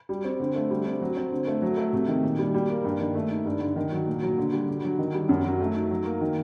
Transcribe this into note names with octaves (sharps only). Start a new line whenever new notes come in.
G3
C4
D3
A3
G3
C4
F#3
C4
D3
A3
F#3
A3
C3
D#3
A#2
G3
G3
A#3
G2
D#3
A3
D#4
G2
D3
D#3
F#3
A#2
F#3
D3
G3
D3
F#3
D#3
G3
F#2
F#3
A3
D#4
F#3
A#3
D#3